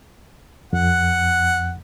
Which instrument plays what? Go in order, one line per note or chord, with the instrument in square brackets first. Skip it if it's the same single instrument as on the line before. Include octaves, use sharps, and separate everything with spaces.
[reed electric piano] F2 [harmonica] F#5